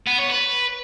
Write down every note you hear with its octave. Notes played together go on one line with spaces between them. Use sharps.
B3
C#5
B4